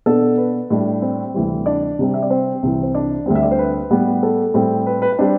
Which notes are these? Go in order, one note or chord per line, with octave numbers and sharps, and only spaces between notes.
B2 B3 D4 A4
B4
A2 G3 D4
C4 C5
D2 C3 E3 G3
D4 D5
C3 G3 C4
E5
D5
C4 C5
C2 C3 E3
C5
D4 D5
D2 D3 G3 C4
E5
D5
C5
B4
A2 G3 B3
A4
A2 G3 C4
B4
B4
B4
G3 C4 D4 C5